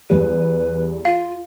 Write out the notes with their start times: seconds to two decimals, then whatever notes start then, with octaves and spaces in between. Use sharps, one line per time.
0.10 E2 G3 B4
1.05 F4 F5